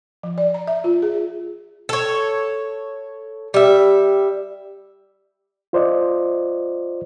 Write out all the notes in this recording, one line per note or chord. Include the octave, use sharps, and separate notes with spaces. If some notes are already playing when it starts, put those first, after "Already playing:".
F3
D5
A#5
E5
F4
G#4
A4 C#5
G3 E5
F4 C5 D5 D#5